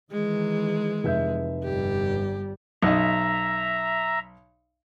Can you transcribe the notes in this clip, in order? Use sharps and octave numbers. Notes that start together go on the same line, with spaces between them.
D#3 E3 G#3
F1 E5 G6
G1 G3 G4
B1 D#5 E5 A#5